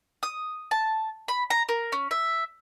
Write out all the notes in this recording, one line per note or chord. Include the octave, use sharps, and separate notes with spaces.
D#6
A5
B5
A#5
A#4
C#4
E5